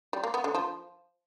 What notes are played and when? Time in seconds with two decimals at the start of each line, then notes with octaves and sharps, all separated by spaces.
0.13 G3
0.24 A#3
0.34 B3
0.44 D3
0.55 F3